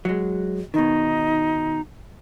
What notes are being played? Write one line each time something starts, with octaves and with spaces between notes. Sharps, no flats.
F#3 G#3
B2 D#3 D#4